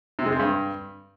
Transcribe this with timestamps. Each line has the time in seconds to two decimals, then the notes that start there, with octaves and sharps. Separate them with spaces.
0.19 C3
0.26 G#3
0.32 C4
0.39 G2